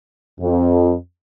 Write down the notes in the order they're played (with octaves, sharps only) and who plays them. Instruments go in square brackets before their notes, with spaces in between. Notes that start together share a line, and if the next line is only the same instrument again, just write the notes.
[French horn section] F2